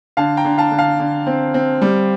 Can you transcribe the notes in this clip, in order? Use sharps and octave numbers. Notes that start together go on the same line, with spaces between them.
D3 F5 A5
G5 A#5
D3
F5 A5
D3
F5 A5
D3
C4
C4
G3